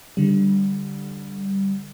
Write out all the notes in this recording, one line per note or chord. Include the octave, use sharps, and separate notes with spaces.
D3 G3